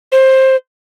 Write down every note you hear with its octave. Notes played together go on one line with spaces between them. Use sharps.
C5